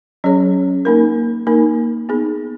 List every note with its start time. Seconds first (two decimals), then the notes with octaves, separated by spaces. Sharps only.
0.24 F#3 C#4 G#4 C#5
0.85 A#3 D#4 A#4
1.47 A#3 D#4 A#4
2.09 B3 D#4 G#4